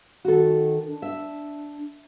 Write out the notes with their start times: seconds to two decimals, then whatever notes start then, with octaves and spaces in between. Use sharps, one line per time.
0.25 D#3 F#4 A4
0.86 D4
1.02 E5